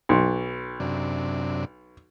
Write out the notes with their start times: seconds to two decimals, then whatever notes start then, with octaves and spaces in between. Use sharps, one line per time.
0.09 B1
0.80 F#2 C3 D4